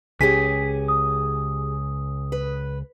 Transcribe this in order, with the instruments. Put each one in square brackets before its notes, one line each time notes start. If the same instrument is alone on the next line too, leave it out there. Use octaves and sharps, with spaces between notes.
[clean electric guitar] C#2 C#4 [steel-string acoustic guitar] G4 G#4 G#5 [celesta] B6
[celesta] D#6
[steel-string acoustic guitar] B4